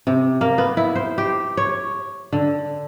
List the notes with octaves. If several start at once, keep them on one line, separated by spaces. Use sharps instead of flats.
C3
A#3
B3
E4
C5
G4
C#5
D3